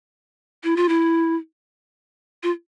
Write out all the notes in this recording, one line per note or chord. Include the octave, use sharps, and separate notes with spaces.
E4
F4
E4
F4